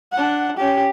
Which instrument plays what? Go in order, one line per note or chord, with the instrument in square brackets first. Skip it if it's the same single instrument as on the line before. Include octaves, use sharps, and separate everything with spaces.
[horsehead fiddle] D4 F#5
C#4 G4